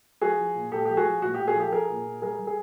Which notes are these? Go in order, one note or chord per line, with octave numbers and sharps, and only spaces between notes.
F3 F#4 G#4
F3
A#2
A#2 G4 A4
F3 G4
F#4 G#4
F3
A#2 F#4
A#2 G4
F#4 G#4
F3 G4 A4
F3 G#4 A#4
A#2
A#2
G3 G#4 A#4
G3
G#4